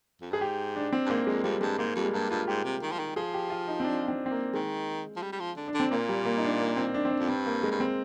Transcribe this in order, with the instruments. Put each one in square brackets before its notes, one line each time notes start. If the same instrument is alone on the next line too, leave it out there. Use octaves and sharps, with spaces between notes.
[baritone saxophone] F2
[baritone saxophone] G2 [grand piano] G#4
[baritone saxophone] G#2 [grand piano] G4
[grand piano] D4
C4
[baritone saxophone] G2
[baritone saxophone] G#2 [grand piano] A#3
[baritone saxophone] F2 [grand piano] G#3
[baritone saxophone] F2 [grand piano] G3
[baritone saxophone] G2 [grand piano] G#3
[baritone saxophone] G#2 [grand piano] A#3
[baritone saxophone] F2 [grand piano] G3
[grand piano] G#3
[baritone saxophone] G2 [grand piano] A#3
[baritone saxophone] G2 [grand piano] F4
[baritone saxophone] G#2 [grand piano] G4
[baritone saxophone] C3
D#3
F3
D#3
[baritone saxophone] F3 [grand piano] G#4
[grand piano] G4
F4
D#4
C4
D4
C4
C4
A#3
[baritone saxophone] D#3 [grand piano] G#3
[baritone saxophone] F3
G3
G3
F3
D3
[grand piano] D4
[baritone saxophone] D3
[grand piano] C4
[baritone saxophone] A#2 [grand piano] A#3
[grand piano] G3
A#3
D#4
D4
A#3
C4
D4
C4
D4
[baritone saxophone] F2
[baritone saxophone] G2 [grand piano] C4
[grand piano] A#3
G#3
[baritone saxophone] G2
[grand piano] C4